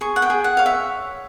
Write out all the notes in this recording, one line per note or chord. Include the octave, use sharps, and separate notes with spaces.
G#4 C#6
F#5
G5
G#4
F#5
C#5 F5
E5